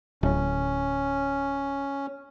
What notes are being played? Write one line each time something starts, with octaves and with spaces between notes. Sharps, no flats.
D1 C#4